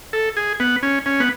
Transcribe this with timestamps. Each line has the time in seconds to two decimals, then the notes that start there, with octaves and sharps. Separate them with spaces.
0.13 A4
0.37 G#4
0.60 B3
0.83 C#4
1.06 C#4
1.20 B3